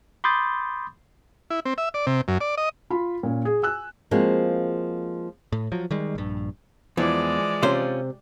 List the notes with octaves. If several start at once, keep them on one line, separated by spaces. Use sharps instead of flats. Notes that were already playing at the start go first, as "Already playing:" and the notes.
B5 C6 D6 D#6 G6 A6
E4
C4
E5
D5
C3
F#2
D5
D#5
F4 B5
A#2 C#4
G#4
G#5 E6 F#6
F3 G#3 A#3 C4 F#4
A2
F3 F#3
D#3 G3 G#3
A#1 G2
E2 E3 F3 G#3 D5
C3 C#4 F4 C5